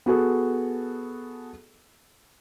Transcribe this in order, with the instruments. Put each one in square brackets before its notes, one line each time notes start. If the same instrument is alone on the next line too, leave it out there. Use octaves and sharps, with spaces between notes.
[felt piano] B3 F#4 G#4 A4